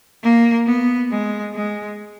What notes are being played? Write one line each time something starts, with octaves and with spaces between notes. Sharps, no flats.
A#3
B3
G#3
G#3